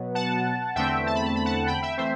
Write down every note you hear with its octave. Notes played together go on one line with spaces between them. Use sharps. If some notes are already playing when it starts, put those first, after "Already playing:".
Already playing: B2 F#3 B3
F#5 A5
E2 D3 A3 C4 E5 G5
A5
B5
A5
B5
F#5 A5
G5 B5
E5 G5
E3 A3 C4 C5 E5